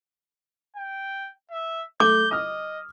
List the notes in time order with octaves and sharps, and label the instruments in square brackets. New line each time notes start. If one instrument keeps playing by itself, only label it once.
[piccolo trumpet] G5
E5
[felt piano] A3 A4 [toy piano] D6 [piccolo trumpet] G6
[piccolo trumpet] D#5 [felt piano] D#6 F6